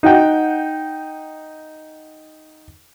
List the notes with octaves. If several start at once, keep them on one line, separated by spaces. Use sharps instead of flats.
D#4 F#5 G5